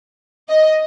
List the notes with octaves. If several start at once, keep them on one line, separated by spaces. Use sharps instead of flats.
D#5